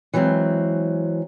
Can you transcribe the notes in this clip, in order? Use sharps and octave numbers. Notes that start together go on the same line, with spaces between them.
E3 F#3 G#3 C4